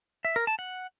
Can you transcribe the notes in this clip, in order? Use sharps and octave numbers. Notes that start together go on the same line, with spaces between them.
E5
A#4
A5
F#5